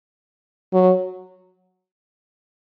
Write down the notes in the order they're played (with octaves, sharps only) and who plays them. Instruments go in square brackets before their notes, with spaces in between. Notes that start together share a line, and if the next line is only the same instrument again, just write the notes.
[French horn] F#3